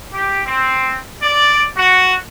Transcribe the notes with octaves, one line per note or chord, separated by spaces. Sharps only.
G4
C4
D5
F#4